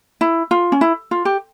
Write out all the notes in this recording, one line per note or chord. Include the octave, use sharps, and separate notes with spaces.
E4
F4
C#4
E4
F4
G4